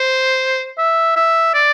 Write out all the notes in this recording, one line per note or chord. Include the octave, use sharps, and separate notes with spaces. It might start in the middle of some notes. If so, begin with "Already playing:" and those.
Already playing: C5
E5
E5
D5